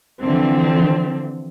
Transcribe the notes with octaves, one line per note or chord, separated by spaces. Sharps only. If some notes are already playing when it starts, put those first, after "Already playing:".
D3 E3 F3 C4